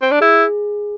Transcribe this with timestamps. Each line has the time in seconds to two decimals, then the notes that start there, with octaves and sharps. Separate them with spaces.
0.02 C4
0.11 D4
0.21 E4 G#4